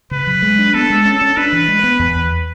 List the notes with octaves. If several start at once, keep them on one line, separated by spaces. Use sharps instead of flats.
C#3 B4
F#3
G#3
D4
B3 A4
G#3
C#4
C#4
D4 B4
E3
G#3
B3
E2
E2